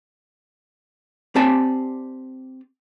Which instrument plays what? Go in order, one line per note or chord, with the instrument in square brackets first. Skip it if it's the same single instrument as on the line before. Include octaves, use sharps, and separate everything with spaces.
[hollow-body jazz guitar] C4 G4 D5 G#5 A5